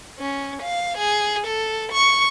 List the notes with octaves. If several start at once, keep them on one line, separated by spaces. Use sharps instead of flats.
C#4
F5
G#4
A4
C#6